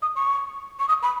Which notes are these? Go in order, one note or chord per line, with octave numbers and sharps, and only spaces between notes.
D#6
C#6
C#6
D#6
B5